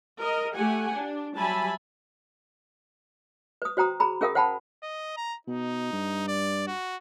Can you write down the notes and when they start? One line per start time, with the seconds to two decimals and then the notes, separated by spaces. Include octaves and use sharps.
0.19 A#4 D#5
0.54 A3 G4 F#5 G#5
0.95 D4
1.35 F#3 G3 E5 G#5 A5 B5
3.62 B4 D#6
3.77 F#4 C5 G5 A#5 D#6
4.00 G#4 A#5 B5
4.21 C#4 G#4 A#4 F5 G5 D#6
4.35 C5 F#5 G5 A5 B5
4.83 D#5
5.17 A#5
5.47 B2 D#4
5.92 G2
6.28 D5
6.67 F#4